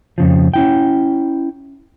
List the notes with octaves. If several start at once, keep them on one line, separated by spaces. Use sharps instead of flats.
F2 C#3 F3
C#4 E4 G5